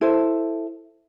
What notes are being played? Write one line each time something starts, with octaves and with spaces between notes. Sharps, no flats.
E4 A4 C5